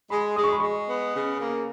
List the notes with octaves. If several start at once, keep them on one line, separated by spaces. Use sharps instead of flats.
G#3 B5
G#3 D#6
C#6
B5
G#3 C#6
B3
C#3
A#3